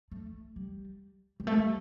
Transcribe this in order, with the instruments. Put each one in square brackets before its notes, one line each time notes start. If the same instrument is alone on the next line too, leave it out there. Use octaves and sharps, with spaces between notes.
[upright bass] A3
G3
G3
A3
G3